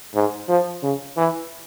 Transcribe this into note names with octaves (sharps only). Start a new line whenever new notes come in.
G#2
F3
C#3
E3